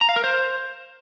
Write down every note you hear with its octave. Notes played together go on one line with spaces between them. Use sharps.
A#5
F5
A#4
C5